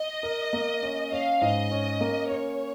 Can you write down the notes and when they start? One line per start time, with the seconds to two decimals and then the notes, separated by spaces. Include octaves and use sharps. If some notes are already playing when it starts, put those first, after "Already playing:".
Already playing: D#5
0.23 A#4
0.53 A#3
0.83 C#4
1.12 C#4 F5
1.41 G#2 D#5
1.71 C#4
2.01 A#3
2.30 C#4 C#5